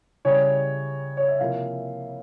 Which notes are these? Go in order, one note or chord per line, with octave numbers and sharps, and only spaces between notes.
C#3 G3 C#4 E4 C#5
C#5
E5
C3 F3 A#3 E4 F5